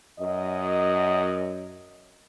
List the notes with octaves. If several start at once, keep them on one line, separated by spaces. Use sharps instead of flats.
F#2 D#5